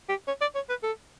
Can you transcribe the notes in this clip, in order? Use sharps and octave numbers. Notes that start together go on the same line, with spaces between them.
G4
C#5
D5
C#5
B4
A4